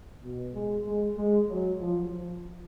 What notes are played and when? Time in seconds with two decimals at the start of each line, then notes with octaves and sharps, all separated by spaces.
0.23 B2
0.54 G#3
0.86 G#3
1.17 G#3
1.49 F#3
1.80 F3
2.11 F3